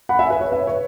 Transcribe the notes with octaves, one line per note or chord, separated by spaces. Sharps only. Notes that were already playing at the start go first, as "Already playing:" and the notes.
F#5 B5
E5 G#5
B4 E5
C#5
B4 E5
C#5